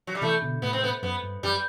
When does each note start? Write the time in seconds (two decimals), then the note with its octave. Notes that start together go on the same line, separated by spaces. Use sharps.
0.07 F#3
0.15 G3
0.22 C3 E3 A3
0.42 B2 D3
0.62 A2 C3 B3
0.73 C4
0.83 B3
1.02 F#2 B3
1.23 G2
1.43 F#2 G3